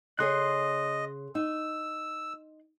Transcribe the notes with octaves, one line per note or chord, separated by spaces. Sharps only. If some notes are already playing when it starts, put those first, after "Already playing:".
C#3 G#4 C#5 D#5 C6 F#6
D#4 E6